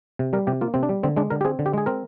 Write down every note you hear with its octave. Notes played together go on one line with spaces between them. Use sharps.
C3
G3 A#4
C3 G4
A#3 F4
C3 C4
D4
G3
D3 C4
G#3 D4
D3 A#4
G4
C4 G#4
D3
G4
G#3 G#4
C4 A#4